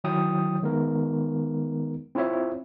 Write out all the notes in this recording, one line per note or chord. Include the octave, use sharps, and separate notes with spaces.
D#3 F#3 E4 G5 D#6
D#3 G#3 B3 D#4 A#4
C4 E4 F4 C5 C#5 E5